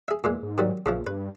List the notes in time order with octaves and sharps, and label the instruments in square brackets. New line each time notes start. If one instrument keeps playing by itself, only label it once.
[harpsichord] G#4 E5
[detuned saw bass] E2 [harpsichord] A#2 E3 G#3
[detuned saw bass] G#2
[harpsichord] D#3 F#3 G3
[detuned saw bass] A#1 [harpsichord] C#3 E3 F3
[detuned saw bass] G2 [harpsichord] B4